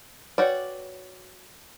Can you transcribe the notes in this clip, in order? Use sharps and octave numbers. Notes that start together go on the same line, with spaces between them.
F#4 B4 C#5 D5 G5